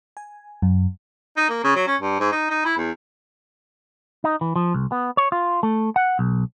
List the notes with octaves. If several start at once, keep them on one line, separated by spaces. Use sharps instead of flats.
G#5
F#2
D#4
A#3
C#3
F#3
C#4
G2
G#2
D#4
D#4
E4
E2
D#4
E3
F3
C2
B3
C#5
F4
A3
F#5
B1